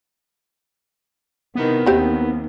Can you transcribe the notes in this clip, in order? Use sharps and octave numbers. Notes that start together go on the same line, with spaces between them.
C3 D#3 B3 E4
D#2 D#3 C4 G4 C5